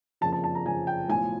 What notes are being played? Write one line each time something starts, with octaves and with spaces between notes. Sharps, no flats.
F#1 F2 C#3 F3 A5
A5
A5
A#5
F#1 F2 C#3 F3 G#5
G5
B1 A2 F3 G#5